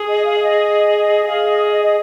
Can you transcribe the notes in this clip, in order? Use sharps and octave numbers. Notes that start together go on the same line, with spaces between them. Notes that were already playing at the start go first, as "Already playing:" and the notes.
Already playing: G#4
D#5
F5
D#5
G#4 F5
D#5
D#5
D#5